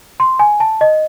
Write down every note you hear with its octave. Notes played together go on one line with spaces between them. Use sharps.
C6
G#5
A5
D#5